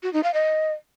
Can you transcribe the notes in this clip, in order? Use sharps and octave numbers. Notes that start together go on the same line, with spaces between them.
F#4
D#4
F5
D#5